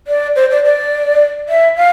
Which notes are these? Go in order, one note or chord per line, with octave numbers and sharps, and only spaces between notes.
D5
C5
D5
D5
E5
F5